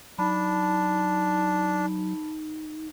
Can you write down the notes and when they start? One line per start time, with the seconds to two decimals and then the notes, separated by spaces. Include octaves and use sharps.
0.19 F#3 D4 D#4 A5 B5